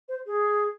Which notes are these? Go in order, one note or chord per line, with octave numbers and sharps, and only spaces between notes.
C5
G#4